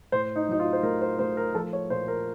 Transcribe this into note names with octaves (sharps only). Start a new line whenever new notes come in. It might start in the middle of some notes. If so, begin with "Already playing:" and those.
A2 C5
D#4
F#3 D#4
F4
C5
A3 A#4
C5
A3 C5
A#4
F3 A4
C#5
A#2 C5
A#4